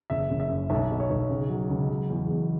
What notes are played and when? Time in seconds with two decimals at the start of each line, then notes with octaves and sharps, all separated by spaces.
0.10 F#1 E5
0.30 F#1
0.40 E5
0.49 F#2
0.70 B1 E5
0.90 B2
1.00 C#5
1.10 B1
1.29 C#3
1.49 F#3
1.69 C#2
1.89 F#3
2.10 E2
2.30 E2